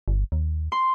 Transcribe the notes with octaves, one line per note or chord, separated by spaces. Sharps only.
G1
D#2
C6